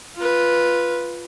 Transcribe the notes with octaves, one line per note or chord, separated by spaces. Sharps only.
F4 B4